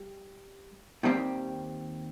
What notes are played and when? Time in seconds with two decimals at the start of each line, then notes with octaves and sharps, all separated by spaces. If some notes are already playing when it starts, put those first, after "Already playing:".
Already playing: G3
1.03 D#2 D#3 G3 C4 G4